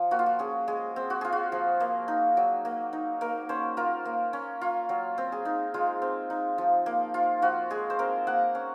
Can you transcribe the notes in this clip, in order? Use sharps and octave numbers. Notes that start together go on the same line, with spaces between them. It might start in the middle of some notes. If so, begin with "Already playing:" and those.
Already playing: F3
A#3 F#4
F4
F#4
C#4 G#4
G#3 G#4
C4
F#4
F4 G#4
F#4
F3
A#3
D#4
F#3
A#3
D#4
A#3 A#4
C#4 C5
F4 A#4
A#3
C#4
F4
F#3
C4
G#4
D#4
G#3 F4
C4
D#4
F3
A#3
F4
F3 F#4
G#3 G#4
C5
C4 A#4
A#3 F#5
C#4